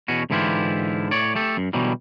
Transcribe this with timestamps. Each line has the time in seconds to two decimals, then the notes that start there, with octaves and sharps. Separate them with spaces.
0.08 E2 B2 C#4 F#4
0.30 G#2 D3 E3 E4 F4 G4
1.11 A2 C#5 D5
1.35 A3 G4 A4
1.57 F#2
1.73 B2 D3 E3 F#3 G3